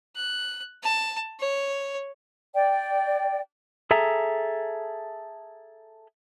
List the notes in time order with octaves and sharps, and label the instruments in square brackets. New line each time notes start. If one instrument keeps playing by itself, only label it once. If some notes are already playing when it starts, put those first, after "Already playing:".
[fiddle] F#6
A5
C#5
[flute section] D5 G5
[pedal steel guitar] G#4 A4 E5 A#5